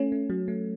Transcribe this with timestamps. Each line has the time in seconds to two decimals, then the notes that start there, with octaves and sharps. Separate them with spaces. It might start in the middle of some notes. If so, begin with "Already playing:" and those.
Already playing: A3 C#4
0.12 A3
0.30 F#3
0.48 A3